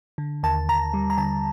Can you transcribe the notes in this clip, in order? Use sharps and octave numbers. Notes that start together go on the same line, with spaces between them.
D3
D#2 A5
D#2 A#5
G3
A#5
D3 A5